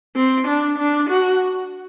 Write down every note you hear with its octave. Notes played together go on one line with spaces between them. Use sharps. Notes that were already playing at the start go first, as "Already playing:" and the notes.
C4
D4
D4
F#4